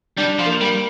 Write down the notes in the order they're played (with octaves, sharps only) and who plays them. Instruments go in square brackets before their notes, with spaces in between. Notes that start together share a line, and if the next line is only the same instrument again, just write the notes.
[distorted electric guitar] G3 [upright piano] D4
[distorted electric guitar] F3
[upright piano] A#3
[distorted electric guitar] G3